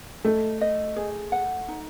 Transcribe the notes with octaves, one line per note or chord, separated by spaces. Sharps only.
A3 D#5
D#5
G#4
F#5
D#4